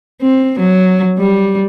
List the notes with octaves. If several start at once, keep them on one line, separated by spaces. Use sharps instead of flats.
C4
F#3
G3